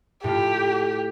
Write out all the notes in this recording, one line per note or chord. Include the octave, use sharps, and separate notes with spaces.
A2 A3 F4 G4